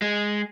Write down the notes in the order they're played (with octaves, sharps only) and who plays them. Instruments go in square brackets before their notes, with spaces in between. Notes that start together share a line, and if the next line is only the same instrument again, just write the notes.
[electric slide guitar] G#3